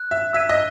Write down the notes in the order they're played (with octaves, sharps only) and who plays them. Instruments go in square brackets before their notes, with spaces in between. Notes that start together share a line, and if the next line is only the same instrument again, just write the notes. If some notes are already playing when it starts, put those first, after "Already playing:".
Already playing: [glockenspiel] F#6
[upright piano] E5
[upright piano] E5 [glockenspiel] E6 G#6 B6 D#7
[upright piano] D#5